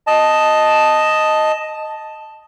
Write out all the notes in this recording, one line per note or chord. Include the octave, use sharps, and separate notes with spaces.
D#5 A5